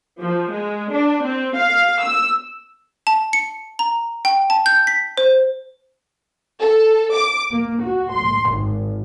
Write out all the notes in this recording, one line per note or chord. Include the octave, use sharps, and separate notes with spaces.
F3
G#3
D4
C4
F5
E6
A5
C#7
A#5
G5
A5
G6
B6
C5
A4
D6
A#3
F#4
C6
G#1